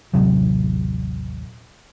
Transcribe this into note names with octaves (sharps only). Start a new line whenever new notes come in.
D#1 A1 C3 F#3